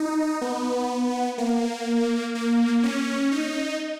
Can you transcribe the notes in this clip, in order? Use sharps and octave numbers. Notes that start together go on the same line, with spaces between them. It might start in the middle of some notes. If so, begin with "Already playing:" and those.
Already playing: D#4
B3
A#3
A#3
C#4
D#4